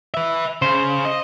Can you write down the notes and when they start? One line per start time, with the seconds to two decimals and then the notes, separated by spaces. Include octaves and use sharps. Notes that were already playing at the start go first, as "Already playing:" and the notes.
0.14 B4 E5
0.62 C#3 C5
1.05 D#5